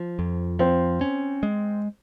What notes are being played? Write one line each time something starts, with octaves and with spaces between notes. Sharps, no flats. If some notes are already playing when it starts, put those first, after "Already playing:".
Already playing: F3
F2
F3 C4
C#4
G#3